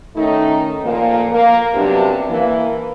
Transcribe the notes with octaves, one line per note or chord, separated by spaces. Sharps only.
D#3 A3 C#4 D#4
A#2 F3 A3 A#3
A#3
F#2 C3 G3 B3 D4
E3 A#3